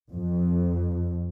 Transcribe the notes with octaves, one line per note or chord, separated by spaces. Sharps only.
F2